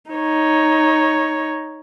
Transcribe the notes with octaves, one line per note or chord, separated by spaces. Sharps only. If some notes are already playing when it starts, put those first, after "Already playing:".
D#4 C#5